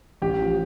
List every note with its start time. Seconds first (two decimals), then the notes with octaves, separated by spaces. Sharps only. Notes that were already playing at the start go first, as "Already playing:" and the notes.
0.22 A1 G4
0.40 F3